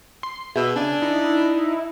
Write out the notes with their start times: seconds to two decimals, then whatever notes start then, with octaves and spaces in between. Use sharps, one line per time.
0.23 C6
0.56 B2 G#4 E5
0.76 C#3 D4 G#5
1.02 D#4 E4